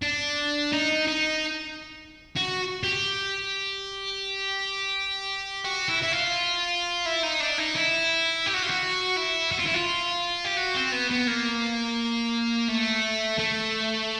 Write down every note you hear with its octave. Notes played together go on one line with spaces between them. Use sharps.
D4
D#4
D#4
F#4
G4
F#4
E4
E4
F4
E4
D#4
D4
D#4
E4
G4
F#4
F4
F#4
E4
F#4
F4
E4
F4
G4
F#4
C4
B3
B3
A#3
A3
A3